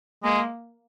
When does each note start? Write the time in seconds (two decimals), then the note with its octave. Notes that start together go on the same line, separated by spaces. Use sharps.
0.24 G#3 A#3